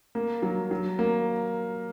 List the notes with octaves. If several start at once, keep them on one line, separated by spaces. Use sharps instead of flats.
A#3
F#3
F#3
A#3